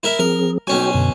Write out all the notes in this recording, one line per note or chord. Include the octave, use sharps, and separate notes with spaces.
E4 A#4 E5
F3 C4 G#4 A#4
B1 C#4 F#4 C#5 G5 G#5
F#2 B2 D3